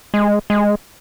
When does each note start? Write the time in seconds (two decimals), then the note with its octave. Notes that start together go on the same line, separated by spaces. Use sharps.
0.14 G#3
0.50 G#3